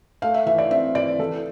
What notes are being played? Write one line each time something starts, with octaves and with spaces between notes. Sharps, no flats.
A3 F5
E5
E3 E5
D5
C4 E5
E3 D5
E3 A4